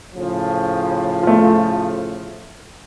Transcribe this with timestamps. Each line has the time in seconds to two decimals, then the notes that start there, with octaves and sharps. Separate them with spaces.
0.15 A2 C#3 F3
1.23 A3 F4